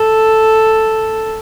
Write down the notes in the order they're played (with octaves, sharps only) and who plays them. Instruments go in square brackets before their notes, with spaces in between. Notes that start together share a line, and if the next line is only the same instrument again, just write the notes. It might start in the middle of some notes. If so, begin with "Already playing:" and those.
Already playing: [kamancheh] A4